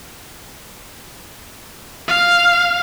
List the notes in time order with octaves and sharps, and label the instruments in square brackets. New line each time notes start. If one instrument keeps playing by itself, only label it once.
[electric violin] F5